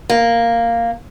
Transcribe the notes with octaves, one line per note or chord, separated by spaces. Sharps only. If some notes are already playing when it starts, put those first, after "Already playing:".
A#3